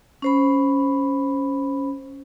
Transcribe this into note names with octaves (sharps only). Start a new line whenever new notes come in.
C#4 C5 B5